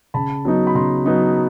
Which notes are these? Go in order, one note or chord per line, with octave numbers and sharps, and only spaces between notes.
C#3 A5 B5
F#3 B3 D#4
B5
C#3 A#5 C6
F#3 B3 D#4